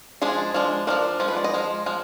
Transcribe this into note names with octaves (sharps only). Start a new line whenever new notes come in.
F3 G#3 D4 G#4
F3 G#3 D4
F3 G#3 D4 A#4
F3 G#3
B4
D5
D#5
F3 G#3
F3 G#3